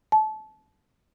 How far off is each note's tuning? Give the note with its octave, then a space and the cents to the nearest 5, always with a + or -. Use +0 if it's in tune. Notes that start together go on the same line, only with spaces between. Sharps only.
A5 -25